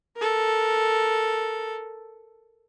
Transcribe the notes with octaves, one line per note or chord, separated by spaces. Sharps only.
A4 A#4